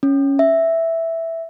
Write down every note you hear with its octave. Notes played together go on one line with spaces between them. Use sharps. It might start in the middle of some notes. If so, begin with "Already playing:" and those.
C#4
E5